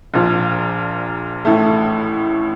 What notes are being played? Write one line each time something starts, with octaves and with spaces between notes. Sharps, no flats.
A#1 A#2 F3
A1 A2 A3